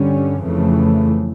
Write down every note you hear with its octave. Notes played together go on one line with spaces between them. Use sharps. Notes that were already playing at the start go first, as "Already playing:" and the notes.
Already playing: G2 D3 G3 C#4
F2 C#3 E3 A3